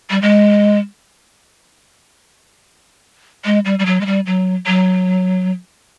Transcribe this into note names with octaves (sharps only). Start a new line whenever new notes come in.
G3
G#3
G#3
G3
G3
F#3
G#3
G3
F#3
F#3